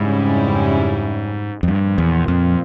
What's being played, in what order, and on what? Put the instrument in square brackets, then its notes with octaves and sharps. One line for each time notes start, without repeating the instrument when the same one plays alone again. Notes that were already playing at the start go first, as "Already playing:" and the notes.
Already playing: [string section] F2 C#3 G3 C#4 E4 [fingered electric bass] G#2
[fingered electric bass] F2
[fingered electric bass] G2 [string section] A#2 F3 C4
[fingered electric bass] E2
F2